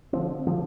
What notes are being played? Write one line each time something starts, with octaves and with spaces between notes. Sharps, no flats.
D3 F3 C4
D3 F3 C4